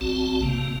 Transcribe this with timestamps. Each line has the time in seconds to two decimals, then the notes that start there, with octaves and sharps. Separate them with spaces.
0.01 A#1 C4 F#4 A5
0.42 C3 A#3